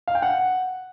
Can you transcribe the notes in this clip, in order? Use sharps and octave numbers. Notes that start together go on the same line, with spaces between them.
F5
G5
F#5